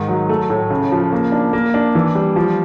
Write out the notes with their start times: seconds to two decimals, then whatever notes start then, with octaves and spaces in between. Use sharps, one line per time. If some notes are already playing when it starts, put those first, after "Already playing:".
Already playing: G#2 D#3
0.08 F#3
0.29 A3
0.50 A2
0.70 C#3
0.92 F3
1.12 A#3
1.32 D4
1.53 A#3
1.74 D4
1.95 E3
2.15 G3
2.36 F3